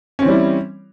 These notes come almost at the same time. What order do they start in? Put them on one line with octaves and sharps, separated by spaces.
C#4 C4 E3 G3 E4